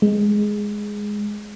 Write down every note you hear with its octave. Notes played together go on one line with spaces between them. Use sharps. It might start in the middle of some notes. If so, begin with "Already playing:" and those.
G#3